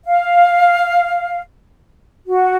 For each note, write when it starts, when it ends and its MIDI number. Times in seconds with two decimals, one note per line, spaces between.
0.05 1.41 77
2.26 2.57 66